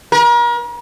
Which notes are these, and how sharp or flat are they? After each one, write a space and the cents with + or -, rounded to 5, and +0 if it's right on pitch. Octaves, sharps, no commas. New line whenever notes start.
A#4 +40